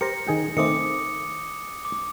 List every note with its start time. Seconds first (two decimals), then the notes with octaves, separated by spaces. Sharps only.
0.01 G4 A#4 C5 A#6 C#7
0.27 D#3 G#4 G5
0.57 D#3 A3 C4 D6 D#6 C#7
1.85 D6